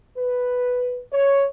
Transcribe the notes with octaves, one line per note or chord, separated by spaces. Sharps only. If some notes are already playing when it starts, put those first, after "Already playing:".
B4
C#5